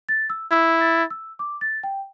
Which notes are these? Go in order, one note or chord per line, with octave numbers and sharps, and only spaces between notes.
A6
E6
E4 E6
A6
E6
D6
A6
G5